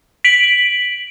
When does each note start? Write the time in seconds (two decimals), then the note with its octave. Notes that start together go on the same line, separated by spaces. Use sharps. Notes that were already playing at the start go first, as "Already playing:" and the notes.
0.24 B6 D7 F#7